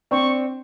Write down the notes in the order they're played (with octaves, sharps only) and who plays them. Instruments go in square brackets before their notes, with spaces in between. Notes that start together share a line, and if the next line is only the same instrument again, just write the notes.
[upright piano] C4 D4 [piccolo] C#6